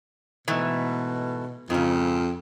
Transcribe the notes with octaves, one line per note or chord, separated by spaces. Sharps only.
G#2 B2 E3 A3
F2 G#2 C#3